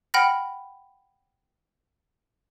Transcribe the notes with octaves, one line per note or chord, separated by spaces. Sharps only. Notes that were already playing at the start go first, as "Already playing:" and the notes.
F#5 G5 B5 F6 A#6